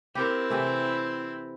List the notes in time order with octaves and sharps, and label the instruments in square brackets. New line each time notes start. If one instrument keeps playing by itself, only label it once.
[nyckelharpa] C4 E4 [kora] G4 A#4
[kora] C3 E3 A3